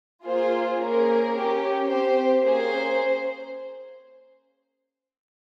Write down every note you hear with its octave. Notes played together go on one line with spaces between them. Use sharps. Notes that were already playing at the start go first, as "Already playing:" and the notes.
A#3 F4 G#4 C5
A#3 C#4 G#4 A#4
C#4 G4
C4 G4 C5
A#3 C#4 G#4 C5